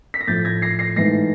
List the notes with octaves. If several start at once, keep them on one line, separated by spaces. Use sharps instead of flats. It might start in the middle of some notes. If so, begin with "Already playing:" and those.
B6
A#6
A2 F3 A3 G6 A6
G#6 A#6
A#6 C7
A#6 C7
G#2 E3 A3 A#6 C7